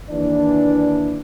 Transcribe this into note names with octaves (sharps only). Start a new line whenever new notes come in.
D#2 E3 D4 D5